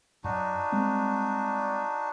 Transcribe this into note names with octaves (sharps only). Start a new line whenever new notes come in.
F#2 D4 D#4 F#4
G3 G#3 C4